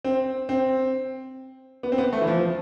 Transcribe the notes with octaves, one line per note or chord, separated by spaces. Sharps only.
C4
C4
B3
C4
B3
A3
E3
F3